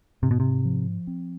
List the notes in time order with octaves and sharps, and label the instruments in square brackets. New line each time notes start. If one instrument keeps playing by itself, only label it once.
[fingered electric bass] G#2 [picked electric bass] C3
[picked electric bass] B2
C3
[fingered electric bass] F3
C4